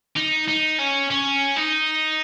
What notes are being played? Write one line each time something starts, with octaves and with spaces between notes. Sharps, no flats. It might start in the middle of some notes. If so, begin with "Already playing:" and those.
D#4
D#4
C#4
C#4
D#4